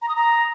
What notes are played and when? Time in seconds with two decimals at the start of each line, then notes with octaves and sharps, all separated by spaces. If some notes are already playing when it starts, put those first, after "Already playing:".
0.02 A#5
0.09 D#6
0.16 A#5